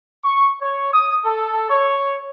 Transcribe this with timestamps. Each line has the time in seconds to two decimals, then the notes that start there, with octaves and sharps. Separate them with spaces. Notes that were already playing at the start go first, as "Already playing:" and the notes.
0.24 C#6
0.61 C#5
0.93 D#6
1.24 A4
1.69 C#5